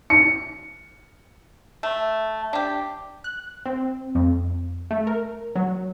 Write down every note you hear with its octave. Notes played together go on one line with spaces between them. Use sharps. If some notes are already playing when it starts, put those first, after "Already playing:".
C#7
A3
D4 G4
F#6
C4
F2
A3
A#4
F#3